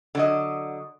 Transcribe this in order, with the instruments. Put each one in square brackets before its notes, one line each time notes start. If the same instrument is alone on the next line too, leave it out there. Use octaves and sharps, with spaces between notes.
[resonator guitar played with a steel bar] D3 F#3 D#5